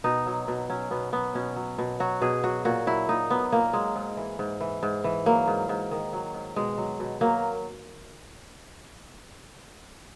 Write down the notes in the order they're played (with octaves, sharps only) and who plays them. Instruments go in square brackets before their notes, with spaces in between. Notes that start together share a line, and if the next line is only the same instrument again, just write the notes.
[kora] B2 D#4
F#3
B2
F#3 C#4
B2 B3
F#3 B3
B2 C#4
F#3
B2
F#3 F#4
B2 G#4
F#3 F#4
A#2 F#4
F#3 E4
A#2 D#4
F#3 B3
A#2 A#3
F#3 G#3
G#2
E3
G#2
E3
G#2
E3
F#3 A#3
G#2
G#2
D#3
F#3
G#2
B2 G#3
F#3
B2
F#3 A#3